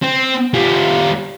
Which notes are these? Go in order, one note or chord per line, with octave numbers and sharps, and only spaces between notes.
C4
G3 F4